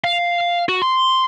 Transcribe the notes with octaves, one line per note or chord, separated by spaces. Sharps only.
F5
F#4
C6